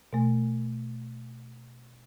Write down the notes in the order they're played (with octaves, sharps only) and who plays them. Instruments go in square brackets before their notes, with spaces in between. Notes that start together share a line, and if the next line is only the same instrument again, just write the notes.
[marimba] B2 A3